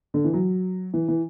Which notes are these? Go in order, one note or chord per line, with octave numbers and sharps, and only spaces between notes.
D3
E3
F#3
E3
E3